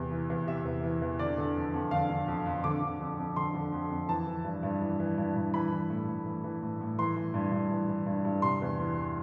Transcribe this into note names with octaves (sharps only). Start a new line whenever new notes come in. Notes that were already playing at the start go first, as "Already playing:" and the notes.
Already playing: E2 C3
E3
E2
C3 E5
E2
E3
E2
D3 D5
D3
F2
F2
D3 F5
D3
F2
F2
D3 D6
D3
F2
F2
D3 C6
D3
F2
F2
E3 A5
E3
G2
G2
E3
E3
G2
G2
E3 B5
E3
A2
A2
E3
E3
A2
A2
E3 C6
E3
G2
G2
E3
E3
G2
G2
C3 C6
E2
E3